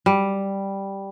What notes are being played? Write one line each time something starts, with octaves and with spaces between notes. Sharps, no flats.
G3